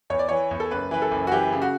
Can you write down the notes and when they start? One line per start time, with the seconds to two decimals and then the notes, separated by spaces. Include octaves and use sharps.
0.10 E2 C#5
0.19 D5
0.29 E3 C#5
0.51 E2
0.60 A4
0.71 F#1 B4
0.91 E3 B4
1.02 A4
1.11 F#1
1.27 F#4
1.31 E3 G4
1.52 C#3
1.62 F#4